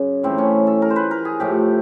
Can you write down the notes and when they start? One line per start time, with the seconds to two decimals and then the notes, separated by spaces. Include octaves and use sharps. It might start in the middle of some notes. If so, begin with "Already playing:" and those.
Already playing: F#2 C#3
0.23 A2 E3 A3 C4
0.38 C#4
0.67 A4
0.82 A#4
0.90 C5
0.96 B4
1.11 A#4
1.25 G#4
1.40 A2 F3 A3 G4